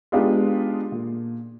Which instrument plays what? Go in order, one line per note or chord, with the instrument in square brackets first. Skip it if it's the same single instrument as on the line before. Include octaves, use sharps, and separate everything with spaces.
[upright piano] G#3 B3 D4 D#4 F4 G4
A#2